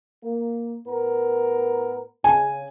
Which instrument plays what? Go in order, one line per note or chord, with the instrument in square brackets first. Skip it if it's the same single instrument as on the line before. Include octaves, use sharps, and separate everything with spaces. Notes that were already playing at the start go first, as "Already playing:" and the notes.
[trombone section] A#3
A2 B3 A#4
[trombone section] C#3 [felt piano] G#5